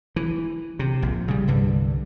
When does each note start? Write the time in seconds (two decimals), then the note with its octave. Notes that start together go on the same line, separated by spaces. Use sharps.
0.16 E3
0.79 C3
1.02 A#1
1.28 C#3 G3
1.48 C2 G2 D3